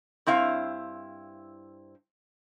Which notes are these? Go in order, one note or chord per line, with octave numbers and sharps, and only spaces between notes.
G2 C4 E4 F5